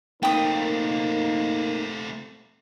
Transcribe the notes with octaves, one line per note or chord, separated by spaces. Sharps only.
A3 A#3 C4 D#4 G5 D#6